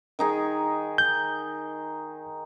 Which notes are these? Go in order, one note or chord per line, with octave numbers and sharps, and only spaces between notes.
D#3 D#4 G#4
G6